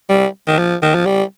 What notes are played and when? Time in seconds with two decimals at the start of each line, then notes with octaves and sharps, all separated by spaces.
0.09 G3
0.47 D#3
0.58 F3
0.82 D#3
0.95 F3
1.06 G3